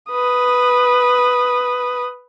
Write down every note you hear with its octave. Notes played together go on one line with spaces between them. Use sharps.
B4 D#6